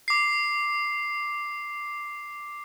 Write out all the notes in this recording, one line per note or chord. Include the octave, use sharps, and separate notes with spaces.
D6 C7